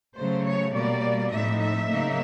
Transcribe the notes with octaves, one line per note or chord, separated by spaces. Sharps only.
C#3 F#3 A3 C5
C#5
B2 G3 A#3 D5
A2 F3 A3 C4 D#4 E5
E5
C#3 F#3 A#3 D#4